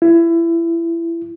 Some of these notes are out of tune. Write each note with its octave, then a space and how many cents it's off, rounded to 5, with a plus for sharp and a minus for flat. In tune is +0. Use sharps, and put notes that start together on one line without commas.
E4 +25